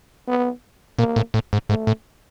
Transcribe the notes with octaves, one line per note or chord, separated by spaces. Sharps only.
B3
A#2 A#3
A2
A2
G#2
G#2 A3
A2